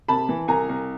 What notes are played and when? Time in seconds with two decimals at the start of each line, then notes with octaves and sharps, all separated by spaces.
0.08 C3 A5 B5
0.29 E3
0.48 C2 G#5 A#5
0.69 C2